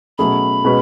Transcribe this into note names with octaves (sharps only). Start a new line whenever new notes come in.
B2 F#3 A3 C#4 G#4 B5
B2 G#3 C#4 F#4 B4